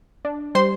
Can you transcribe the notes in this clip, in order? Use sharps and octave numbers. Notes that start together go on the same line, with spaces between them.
D4
G3 C5 C6